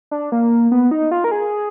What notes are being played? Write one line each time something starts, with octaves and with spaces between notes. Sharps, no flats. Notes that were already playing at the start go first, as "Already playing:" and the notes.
D4
A#3
B3
D#4
F4
A#4
G#4